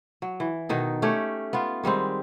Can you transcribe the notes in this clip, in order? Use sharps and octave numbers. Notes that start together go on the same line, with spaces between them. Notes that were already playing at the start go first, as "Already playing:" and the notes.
F#3
E3
B2 D#3 D#4 A4
A3 C#4 G4 C#5
B3 F4
D#3 G3 G#3 C4